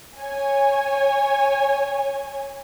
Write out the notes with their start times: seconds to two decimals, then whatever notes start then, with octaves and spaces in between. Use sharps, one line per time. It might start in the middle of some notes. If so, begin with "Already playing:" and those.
0.17 C#5 G#5